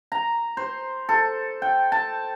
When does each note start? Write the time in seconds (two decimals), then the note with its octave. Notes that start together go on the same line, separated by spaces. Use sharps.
0.12 A#5
0.57 C5
1.09 A4
1.62 G5
1.92 A5